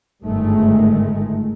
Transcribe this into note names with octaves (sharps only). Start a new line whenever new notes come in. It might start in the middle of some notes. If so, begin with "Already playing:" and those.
G1 G#2 D#3 G#3 A3